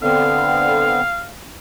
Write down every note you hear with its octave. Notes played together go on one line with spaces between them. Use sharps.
D3 B3 C4 F5